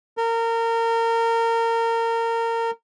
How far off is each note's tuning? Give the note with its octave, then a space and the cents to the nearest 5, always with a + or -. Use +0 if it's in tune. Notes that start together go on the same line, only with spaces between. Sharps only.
A#4 -25